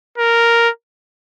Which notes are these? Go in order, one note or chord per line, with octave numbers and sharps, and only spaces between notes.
A#4